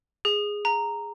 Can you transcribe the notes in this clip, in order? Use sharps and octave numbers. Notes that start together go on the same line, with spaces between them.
G#4
A#5